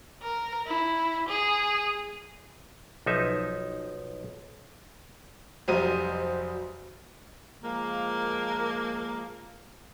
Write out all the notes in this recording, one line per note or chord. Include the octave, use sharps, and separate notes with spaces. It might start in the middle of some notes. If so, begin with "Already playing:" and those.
A#4
E4
G#4
B1 F3 D#4 E5
F1 F#3 G3 C5 D#5 D#7
F3 G#3 A#3